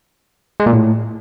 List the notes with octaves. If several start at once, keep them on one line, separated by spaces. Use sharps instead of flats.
G#3
A#2
A2